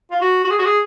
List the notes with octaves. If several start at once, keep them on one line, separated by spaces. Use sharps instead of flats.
F4
F#4
F#4
G#4
F#4
G#4